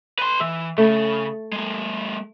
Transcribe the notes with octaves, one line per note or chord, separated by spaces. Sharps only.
B4 C6
E3 E5
C#3 A3
G#3 A#3